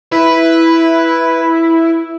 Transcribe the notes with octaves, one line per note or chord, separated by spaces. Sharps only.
E4 B4